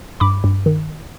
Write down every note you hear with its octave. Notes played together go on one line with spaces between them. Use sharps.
G2 B5 D6
G2
D#3